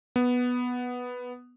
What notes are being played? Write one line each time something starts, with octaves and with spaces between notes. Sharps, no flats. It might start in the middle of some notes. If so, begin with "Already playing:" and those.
B3